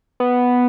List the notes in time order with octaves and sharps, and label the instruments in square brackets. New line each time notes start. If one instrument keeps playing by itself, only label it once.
[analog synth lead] B3